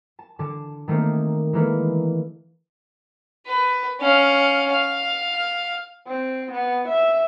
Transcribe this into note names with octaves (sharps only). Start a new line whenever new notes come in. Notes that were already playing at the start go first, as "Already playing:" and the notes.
A5
D3 A5
D#3 A3 A#3 C4 D#4
E3 G#3 A#3 A4 B4
B4
C#4 F5
F5
C4
B3
E5